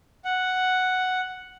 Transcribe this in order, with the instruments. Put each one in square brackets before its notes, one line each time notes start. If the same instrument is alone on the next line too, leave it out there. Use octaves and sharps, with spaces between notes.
[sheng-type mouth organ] F#5